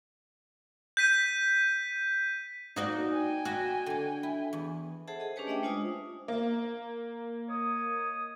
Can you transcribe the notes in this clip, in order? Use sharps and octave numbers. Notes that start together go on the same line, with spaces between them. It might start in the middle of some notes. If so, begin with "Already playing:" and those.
G6 B6 D#7
A#3 D#4 F#4 D5
G5 G#5
F#4 D5 D#5 B5
D3 D5
E4
E2
G#4 A4 C5 E5 F#5 A5
G#4 D#5
C#4 D4 G4 B4 C#5 G#5
A3 D4 D#5 E5 G5
G#3 D4 F4 C5 G#5 D#6
A#3
C#5 D#5 D#6